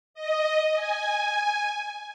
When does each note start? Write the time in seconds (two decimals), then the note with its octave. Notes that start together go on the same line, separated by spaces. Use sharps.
0.14 D#5
0.75 G#5